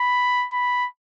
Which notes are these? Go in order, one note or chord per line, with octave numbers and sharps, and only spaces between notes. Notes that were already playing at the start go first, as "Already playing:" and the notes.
Already playing: B5
B5